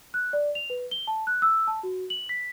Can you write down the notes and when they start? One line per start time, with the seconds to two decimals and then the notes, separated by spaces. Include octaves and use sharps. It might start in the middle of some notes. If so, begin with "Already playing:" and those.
0.14 F#6
0.33 D5
0.55 F7
0.70 B4
0.91 G7
1.07 A5
1.27 F#6
1.42 E6
1.68 A5
1.83 F#4
2.10 F#7
2.29 B6